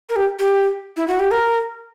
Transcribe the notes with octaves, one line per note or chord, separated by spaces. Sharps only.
A#4
G4
G4
E4
F#4
G4
A#4